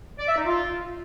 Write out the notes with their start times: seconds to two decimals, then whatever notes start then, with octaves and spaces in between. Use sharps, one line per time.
0.19 D5
0.28 E5
0.37 D#4
0.46 F4